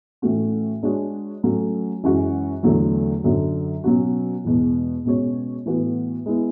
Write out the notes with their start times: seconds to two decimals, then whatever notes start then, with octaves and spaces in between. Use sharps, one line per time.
0.22 A2 E3 A3 C#4 F#4
0.83 G#3 D4 F#4 C#5
1.43 F#3 A3 C#4
2.04 F#2 E3 G#3 C#4 F#4
2.63 E2 D3 F#3 A3
3.24 F#2 D3 F#3
3.84 B2 F#3 C#4 F#4
4.45 E2 B2 G#3
5.05 B2 G#3 C#4 F#4 C#5
5.66 A2 E3 B3 F#4 B4
6.26 G#3 B3 E4